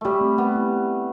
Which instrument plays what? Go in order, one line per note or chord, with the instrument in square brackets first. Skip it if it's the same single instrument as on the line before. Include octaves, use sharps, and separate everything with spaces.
[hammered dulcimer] G3 A3 [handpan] G4
[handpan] C4
[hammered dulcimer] B3 [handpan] C4
[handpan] E4